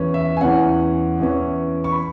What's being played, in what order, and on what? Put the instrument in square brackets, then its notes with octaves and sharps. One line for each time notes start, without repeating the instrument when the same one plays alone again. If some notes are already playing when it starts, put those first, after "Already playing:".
Already playing: [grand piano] E2 E3 C#4
E5
G#5
E2 E3 C#4 F#5
E2 E3 C#4
C#6
B5